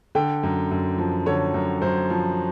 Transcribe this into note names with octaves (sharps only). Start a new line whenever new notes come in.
D3 G5
F#2
F#2
F3
D3 C#5
F#2
F#2 C5
F3